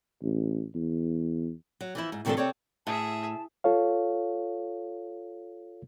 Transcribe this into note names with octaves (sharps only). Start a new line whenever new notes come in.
A1
E2
F#3
E3 F3 E4
G#2
G#2 C3 D#3 F3 D4 A4
C3 C4 A4 C#5 D5
A2 G#4 E5 A5
F4 A4 C#5 F5